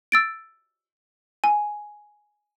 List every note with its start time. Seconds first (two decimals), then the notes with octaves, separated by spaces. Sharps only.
0.12 E6 A6 D7
1.44 G#5